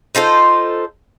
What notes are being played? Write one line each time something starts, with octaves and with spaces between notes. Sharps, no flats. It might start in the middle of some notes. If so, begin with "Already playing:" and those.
D#4 F4 A4 C5